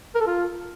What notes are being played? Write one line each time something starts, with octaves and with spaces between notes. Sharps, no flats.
A#4
A4
F4